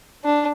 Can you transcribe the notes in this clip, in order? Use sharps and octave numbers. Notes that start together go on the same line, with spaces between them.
D4